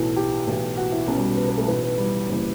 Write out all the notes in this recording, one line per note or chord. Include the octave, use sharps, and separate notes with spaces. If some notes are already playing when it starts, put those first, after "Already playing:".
Already playing: B1 A2 E3 A4
G4
B1 A2 E3
F#4
E4
B1 B2 C#4
G3
B3
B3
A3
B1 A2 E3 B3
B3
G3
F#1 E3